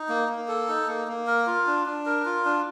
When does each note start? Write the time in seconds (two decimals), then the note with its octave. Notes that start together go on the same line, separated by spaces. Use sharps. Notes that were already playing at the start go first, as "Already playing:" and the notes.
Already playing: D#4
0.09 A#3
0.29 A#3
0.48 A4
0.68 D#4
0.88 A#3
1.08 A#3
1.27 A#4
1.47 F4
1.67 D4
1.86 D4
2.06 A#4
2.25 F4
2.45 D4